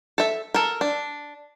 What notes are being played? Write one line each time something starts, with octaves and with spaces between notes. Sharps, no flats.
A4 E5
A4 A#4
D4